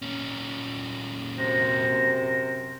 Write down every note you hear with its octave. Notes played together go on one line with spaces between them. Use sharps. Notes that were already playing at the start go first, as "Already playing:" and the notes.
A#2 C#4
F#2 C3 C5 A#6